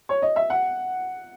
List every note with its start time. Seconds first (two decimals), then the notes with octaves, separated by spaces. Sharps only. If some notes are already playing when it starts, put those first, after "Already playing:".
0.09 C#5
0.22 D#5
0.36 E5
0.50 F#5